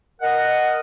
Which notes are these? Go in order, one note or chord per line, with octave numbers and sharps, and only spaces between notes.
A#4 D#5 F#5